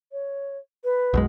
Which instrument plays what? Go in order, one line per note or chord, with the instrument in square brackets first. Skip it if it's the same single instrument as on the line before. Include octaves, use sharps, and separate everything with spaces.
[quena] C#5
B4
[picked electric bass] B1 F#2 G#3